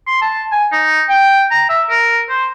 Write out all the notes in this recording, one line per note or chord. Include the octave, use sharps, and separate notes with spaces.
C6
A5
G#5
D#4
G5
A#5
E5
A#4
C5